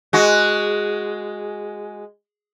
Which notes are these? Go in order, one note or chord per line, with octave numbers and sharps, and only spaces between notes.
G#3 F#4